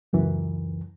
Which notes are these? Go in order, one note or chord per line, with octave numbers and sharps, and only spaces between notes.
C#2 F#2 E3